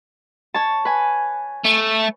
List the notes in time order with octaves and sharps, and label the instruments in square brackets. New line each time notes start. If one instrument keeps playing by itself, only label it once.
[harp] C#5 A5
B4 G#5
[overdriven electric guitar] A3